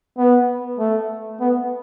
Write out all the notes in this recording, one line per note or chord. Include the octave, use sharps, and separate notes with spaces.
B3
A3
B3